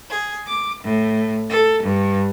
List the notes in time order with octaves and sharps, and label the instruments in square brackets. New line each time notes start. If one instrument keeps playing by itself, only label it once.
[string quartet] G#4
D6
A2
A4
G2